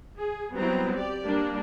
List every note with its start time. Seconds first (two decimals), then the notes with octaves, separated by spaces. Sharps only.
0.16 G#4
0.54 F#3 G3 B3 C4 E4 A#5
0.94 G4 D5
1.26 G3 A#3 D4